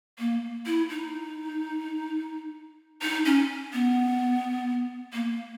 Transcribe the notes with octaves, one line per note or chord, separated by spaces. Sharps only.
A#3
E4
D#4
D#4
C#4
B3
A#3